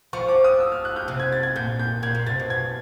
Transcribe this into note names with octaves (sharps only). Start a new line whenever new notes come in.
F3 C#6
D6
D#6
E6
F6
F#6
G6
C3 F#6
G#6
A6
G#6
A#2 G6
G6
A#2 G#6
A#2
C3 A6
B2
G#6